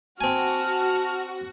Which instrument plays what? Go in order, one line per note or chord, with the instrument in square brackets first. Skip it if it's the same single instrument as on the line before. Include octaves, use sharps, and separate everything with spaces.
[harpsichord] C4 G#5 [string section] F#4 [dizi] A5 [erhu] F6